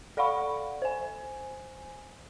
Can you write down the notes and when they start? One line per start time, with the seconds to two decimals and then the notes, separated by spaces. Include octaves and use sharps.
0.17 A4 D5 F5 F#5 B5 C#6
0.82 C5 G#5